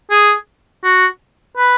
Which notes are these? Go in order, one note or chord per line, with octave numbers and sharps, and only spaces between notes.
G#4
F#4
B4